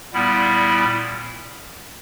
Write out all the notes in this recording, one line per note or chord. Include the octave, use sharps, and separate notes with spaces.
A#2 G3 B3 E4